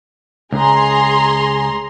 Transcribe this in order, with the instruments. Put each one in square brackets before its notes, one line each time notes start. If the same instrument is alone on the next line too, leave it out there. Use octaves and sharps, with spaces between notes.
[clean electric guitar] C#2 [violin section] G#4 A#5 C6